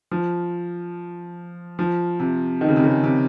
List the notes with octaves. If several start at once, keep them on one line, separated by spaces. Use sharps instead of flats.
F3
F3
C3
D#3
C#3
C3
C#3
C3